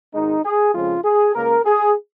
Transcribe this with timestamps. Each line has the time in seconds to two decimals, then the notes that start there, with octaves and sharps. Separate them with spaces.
0.14 G#1 G#2 G#3 D#4
0.44 G#4
0.75 F2 C#3 F3 G#3 F4
1.05 G#4
1.35 C#2 C#3 A#3 A#4
1.65 G#4